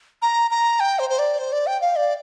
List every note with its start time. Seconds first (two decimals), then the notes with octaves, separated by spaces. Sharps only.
0.22 A#5
0.51 A#5
0.80 G5
0.99 C5
1.10 C5
1.19 D5
1.39 C5
1.52 D5
1.67 G5
1.81 F5
1.96 D5